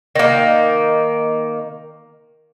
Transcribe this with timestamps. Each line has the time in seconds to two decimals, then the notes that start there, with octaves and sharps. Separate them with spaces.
0.16 D#3 A#3